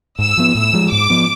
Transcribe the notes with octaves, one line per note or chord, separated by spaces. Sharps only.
G#2 E6
F3 B3
A2 E6
F3 G#3
G#2 D6
F3 B3